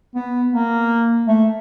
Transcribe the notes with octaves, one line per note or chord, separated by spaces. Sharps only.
B3
A#3
A3